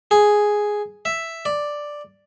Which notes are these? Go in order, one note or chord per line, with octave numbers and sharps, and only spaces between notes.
G#4
E5
D5